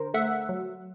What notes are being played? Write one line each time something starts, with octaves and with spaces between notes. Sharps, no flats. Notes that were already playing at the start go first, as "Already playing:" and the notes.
Already playing: D3 A#4 C5
A3 E5 F#5
F#3